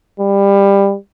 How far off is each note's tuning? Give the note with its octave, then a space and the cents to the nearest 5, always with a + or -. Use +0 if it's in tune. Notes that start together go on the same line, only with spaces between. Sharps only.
G3 +20